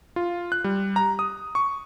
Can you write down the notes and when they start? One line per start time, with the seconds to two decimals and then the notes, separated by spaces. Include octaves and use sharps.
0.16 F4
0.52 F#6
0.64 G3
0.96 A#5
1.19 D#6
1.55 C#6